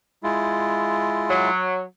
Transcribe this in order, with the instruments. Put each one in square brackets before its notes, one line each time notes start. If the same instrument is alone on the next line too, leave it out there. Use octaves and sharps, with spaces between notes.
[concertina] G#3 E4 F4
[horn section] F#3